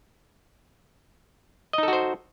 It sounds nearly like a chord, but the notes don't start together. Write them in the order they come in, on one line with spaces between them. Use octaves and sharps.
D#5 D#4 A4 F#4 C5